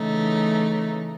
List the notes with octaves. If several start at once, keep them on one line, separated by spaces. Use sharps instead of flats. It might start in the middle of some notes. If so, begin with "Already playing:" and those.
Already playing: C#3 E3 A3 D#4